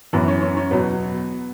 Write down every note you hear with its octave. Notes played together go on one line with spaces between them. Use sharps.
F#2 E3 B3
C#4
C#4
C#4
E2 B2 F#3 B3